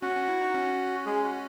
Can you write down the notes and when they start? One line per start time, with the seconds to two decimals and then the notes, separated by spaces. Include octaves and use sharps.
0.02 C#4 F#4
0.16 C#4
0.28 E4
0.41 D#4
0.54 C#4
1.06 G#3 G#4
1.23 F#4